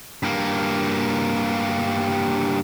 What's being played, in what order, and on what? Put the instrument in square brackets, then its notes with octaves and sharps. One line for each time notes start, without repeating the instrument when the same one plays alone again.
[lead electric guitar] G2 A#3